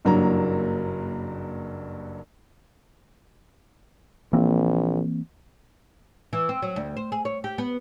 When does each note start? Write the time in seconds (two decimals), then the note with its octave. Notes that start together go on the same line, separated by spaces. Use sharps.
0.05 F#1 G2 F#3 A#3 A#5
4.33 A#1 E3 A#3 C4
6.33 E3
6.49 C4
6.62 F#3
6.76 D2
6.97 C5
7.12 G#4
7.25 C#5
7.44 G4
7.58 B3